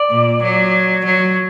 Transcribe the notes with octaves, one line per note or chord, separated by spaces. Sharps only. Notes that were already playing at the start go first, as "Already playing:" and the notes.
Already playing: D5
A#2
F#3
F#3